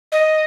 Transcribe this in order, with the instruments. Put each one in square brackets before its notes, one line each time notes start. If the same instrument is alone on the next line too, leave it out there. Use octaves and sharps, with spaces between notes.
[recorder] D#5